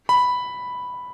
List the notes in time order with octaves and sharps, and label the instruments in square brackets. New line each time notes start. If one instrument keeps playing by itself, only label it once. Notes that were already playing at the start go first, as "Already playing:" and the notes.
[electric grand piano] B5